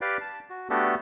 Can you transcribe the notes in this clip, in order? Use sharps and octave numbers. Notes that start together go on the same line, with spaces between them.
G4 B4 D5 F5 G5
A5
F#4
A3 B3 D4 F#4 G4 A4